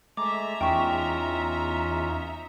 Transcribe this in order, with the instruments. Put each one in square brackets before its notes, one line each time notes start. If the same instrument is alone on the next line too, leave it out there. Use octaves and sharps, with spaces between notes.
[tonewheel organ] G#3 A3 [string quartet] E5 A#5 [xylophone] D6
[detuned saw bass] E2 [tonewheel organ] C#4 D#4 F4 [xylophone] G5 C#6